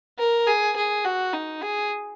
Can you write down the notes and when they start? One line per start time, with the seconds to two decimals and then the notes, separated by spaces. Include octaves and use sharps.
0.18 A#4
0.47 G#4
0.76 G#4
1.05 F#4
1.34 D#4
1.62 G#4